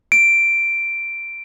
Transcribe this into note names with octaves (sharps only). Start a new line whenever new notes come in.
D7